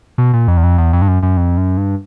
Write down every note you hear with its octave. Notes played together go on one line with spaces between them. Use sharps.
B2
A#2
F2
E2
F2
E2
F2
G2
F#2
F#2
F2
F#2
G2